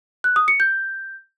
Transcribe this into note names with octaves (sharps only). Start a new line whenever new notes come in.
F#6
D#6
C#7
G6